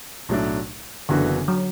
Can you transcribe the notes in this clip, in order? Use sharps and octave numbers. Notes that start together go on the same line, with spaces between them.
B1 A2 F#3 A3 D4
F#1 F#2 D3 E3 B3 F#4
F#3